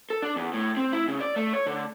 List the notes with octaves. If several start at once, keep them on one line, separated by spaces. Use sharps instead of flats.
A4
D4
E2
A2
C4
E4
C#3
D5
A3
C#5
D3